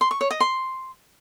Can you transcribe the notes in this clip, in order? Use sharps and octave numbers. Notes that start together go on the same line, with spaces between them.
C6
C#6
C#5
D#5
C6